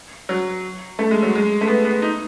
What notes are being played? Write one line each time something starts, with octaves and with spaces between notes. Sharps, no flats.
F#3
A3
G#3
F#3
G#3
A3
B3
B3
D#4